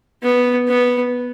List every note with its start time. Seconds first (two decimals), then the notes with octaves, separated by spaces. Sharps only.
0.23 B3
0.68 B3